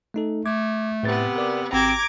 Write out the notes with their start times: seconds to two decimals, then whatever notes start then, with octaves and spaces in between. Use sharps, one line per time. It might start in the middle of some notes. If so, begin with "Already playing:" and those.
0.14 A3 D#4 A4
0.46 A3 D6 G#6
1.03 A2 C3 B3 B4 A6
1.36 A#4 D5 D6
1.73 G#1 C4 A#5 D6 G#6